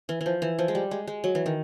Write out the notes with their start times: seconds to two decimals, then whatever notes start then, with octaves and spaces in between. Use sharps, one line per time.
0.09 E3
0.21 E3
0.26 F3
0.42 E3
0.59 F3
0.68 G#3
0.75 G3
0.91 G#3
1.07 G#3
1.24 F#3
1.35 E3
1.46 D#3